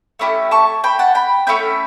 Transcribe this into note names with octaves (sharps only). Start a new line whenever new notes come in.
A3 C#4 E4 G4
A5 C#6
G5 B5
F#5 A5
G5 B5
A3 C#4 E4 G5 B5